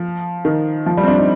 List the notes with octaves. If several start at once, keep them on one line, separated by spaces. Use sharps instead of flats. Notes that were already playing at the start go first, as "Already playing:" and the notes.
Already playing: F3
D#3
F3
G3
C4
D4
D#4